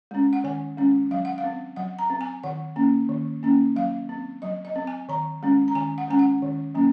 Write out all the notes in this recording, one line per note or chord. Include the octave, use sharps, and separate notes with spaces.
G#3 C#4
F#5
D#3 G#5
G#3 C#4
F#3 F5
F#5
F5
C4
F#3 F#5
A#5
C4
G#5
D#3 F#5
A#3 C#4
D#3
A#3 C#4
F#3 F5
C4
F#3 D#5
D#5
C4
G#5
D#3 A#5
G#3 C#4
A#5
D#3 G#5
F#5
G#3 C#4 G#5
F#5
D#3
F#3 A#3 C#4